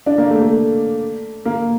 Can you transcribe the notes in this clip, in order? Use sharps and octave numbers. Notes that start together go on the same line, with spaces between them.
D4
A#3
A3
A3
A#3